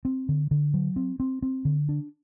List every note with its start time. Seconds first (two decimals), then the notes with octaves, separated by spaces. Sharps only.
0.05 C4
0.29 D3
0.51 D3
0.74 F#3
0.96 C4
1.20 C4
1.42 C4
1.65 D3
1.89 D4